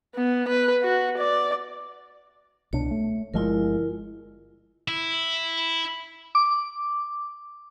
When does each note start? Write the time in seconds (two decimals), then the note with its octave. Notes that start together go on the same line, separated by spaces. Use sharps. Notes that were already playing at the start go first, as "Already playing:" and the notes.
0.15 B3
0.49 B4
0.83 F#4
1.18 D5
2.73 C2 B2 D4 C#5
2.91 A3
3.34 G1 F3 G#3 E4 F4 A#4
4.88 E4
6.35 D6